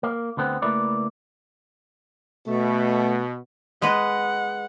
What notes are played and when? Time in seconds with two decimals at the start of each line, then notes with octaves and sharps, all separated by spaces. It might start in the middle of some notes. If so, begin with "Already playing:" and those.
0.03 A#3
0.37 D2 D3 B3 C4
0.62 C#2 A3 A#3 E4 B4 D5
2.47 B2 A3
3.82 G#3 B4 D#5 F#5